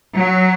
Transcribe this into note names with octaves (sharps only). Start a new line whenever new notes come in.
F#3